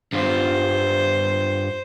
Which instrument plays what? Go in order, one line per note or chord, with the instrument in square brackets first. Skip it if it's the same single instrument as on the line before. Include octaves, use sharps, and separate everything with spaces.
[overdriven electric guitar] G2 F4 [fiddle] C5